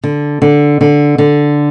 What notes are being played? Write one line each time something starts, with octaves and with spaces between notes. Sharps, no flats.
D3
D3
D3
D3